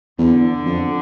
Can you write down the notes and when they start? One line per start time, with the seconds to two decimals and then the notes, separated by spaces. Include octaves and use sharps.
0.19 E2 D3
0.66 F2